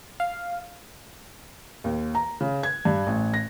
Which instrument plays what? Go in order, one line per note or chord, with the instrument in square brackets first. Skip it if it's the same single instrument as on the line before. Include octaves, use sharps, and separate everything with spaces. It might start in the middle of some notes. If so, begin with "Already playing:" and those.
[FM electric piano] F5
[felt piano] D#2
A#5
C#3
G#6
G2
A1
A#6